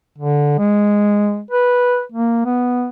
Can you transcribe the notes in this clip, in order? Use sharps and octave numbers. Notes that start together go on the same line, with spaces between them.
D3
G#3
B4
A#3
B3